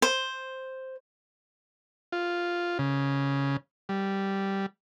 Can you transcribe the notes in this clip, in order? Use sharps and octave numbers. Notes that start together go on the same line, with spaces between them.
C5
F4
C#3
G3